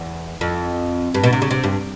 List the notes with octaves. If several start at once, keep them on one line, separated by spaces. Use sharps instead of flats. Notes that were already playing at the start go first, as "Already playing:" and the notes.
Already playing: E2
F2
G2
B2
C3
C#3
C3
G2